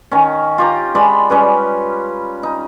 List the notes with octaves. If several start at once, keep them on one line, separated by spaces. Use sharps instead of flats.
D#3 C#4
F4 G4 A#5
G#3 D5 B5
G3 C#4 B4
D#4